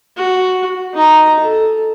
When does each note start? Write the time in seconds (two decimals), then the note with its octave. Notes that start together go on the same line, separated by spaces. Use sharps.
0.17 F#4
0.94 D#4 A#5
1.40 A4